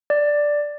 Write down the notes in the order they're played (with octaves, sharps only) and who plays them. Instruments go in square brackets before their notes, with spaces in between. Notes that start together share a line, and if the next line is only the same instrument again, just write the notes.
[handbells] D5